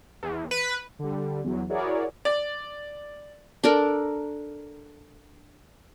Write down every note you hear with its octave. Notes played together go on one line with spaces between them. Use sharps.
E2
B4
D3 G3
E2 F#3
E4 F#4 G#4 A#4 C#5 D5
D5
D4 A4 A#4